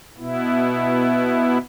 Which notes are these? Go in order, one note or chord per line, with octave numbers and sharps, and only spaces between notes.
B2 B3 E4